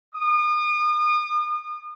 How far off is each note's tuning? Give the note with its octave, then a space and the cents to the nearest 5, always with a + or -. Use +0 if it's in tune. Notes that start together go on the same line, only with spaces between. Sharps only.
D#6 -40